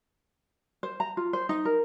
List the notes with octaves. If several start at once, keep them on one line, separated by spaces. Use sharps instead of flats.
C5
A#5
F4
C5
D#4
A#4